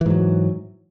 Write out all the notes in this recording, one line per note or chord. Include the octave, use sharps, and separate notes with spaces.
G#2 E3 F#3